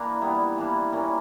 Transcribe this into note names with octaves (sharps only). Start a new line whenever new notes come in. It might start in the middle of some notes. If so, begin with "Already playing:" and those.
Already playing: E3 A#3 D4 A#4
A#2 G3 B3 E4
E3 A#3 D4
A#2 A#3 C#4 A#4